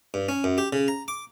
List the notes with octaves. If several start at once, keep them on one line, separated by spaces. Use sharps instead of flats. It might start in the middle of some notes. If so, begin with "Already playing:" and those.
G2
C#4
F#2
G4
C#3
A#5
D6